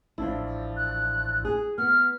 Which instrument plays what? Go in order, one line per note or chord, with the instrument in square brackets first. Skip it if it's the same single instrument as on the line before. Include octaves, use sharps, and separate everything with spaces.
[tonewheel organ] A1 A2 [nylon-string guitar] F3 D4 E4
[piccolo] F#6
[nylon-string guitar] G#4
[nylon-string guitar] B3 [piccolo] F6